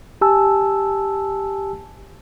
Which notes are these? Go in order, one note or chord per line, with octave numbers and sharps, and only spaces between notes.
G4 G#5 A5 E6